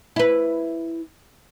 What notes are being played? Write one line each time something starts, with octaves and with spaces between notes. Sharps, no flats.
E4 B4